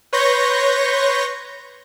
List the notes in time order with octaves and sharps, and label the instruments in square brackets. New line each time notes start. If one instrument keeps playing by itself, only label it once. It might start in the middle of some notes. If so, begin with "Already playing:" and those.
[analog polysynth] B4 C#5 C6 C#6 G6 A#6